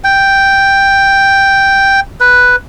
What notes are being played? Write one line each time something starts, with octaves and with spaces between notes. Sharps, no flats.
G5
B4